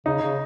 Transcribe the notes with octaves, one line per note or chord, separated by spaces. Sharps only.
C#3 D#4
C#3